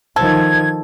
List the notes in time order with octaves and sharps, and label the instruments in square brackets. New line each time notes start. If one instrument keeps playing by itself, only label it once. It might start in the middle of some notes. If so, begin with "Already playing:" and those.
[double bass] D#3 F3 [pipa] A4 [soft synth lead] G#6